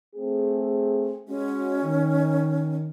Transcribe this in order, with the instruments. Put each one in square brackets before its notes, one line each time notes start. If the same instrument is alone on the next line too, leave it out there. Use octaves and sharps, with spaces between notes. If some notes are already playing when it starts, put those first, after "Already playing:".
[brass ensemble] A3 C4 G#4
[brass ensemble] G#3 F#4 [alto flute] C#4
[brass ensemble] D#3